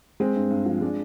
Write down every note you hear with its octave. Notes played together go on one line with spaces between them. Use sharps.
G#3 C4
G2
G2
F3
G#3 D4